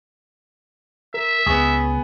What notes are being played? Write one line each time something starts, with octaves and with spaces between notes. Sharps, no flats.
A#4 E5
C#2 B3 G#4 C#6 D#6